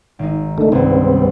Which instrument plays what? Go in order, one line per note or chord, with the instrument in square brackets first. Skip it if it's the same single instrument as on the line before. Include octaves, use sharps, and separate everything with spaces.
[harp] G#1 D#4
[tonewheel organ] D3 D#3 A3
[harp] C2 G2 [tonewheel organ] C#3 B3 C4